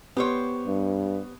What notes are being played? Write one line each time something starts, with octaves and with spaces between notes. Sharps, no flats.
B3 G4 C5 C#5
G2